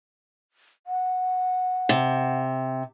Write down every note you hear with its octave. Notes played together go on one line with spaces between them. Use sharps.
F#5
C3